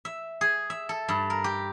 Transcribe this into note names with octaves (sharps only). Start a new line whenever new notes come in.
E5
G#4
E5
A4
G2
A#4
G4